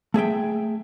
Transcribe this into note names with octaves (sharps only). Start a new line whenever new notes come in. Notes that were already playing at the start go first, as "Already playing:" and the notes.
A3 G#4 E5 G5